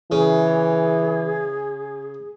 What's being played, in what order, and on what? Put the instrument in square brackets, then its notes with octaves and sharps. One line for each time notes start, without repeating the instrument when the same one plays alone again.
[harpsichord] C#3 [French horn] E3 [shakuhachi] G#4